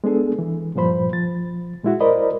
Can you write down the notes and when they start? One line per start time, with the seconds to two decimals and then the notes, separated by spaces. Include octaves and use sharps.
0.04 G#3 B3 D4 G#4 A4
0.39 E3
0.75 G2 A#2 F3 C5 B5
1.13 F3 A6
1.83 A#2 G#3 E4 F#4
2.00 A#4 C5 D5 D#5 B5